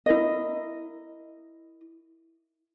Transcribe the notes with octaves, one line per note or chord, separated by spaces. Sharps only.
E4 A#4 D#5